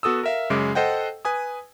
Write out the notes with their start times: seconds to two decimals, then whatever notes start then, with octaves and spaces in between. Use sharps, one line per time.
0.03 B3 F#4 A4 D#6 E6
0.23 A#4 E5 F5
0.50 F#2 C#3 G#3 D6
0.75 A4 C5 D#5 F#5 G5
1.25 B4 G#5 D#6